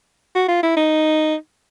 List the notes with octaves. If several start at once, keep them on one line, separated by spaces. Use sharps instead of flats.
F#4
F4
E4
D#4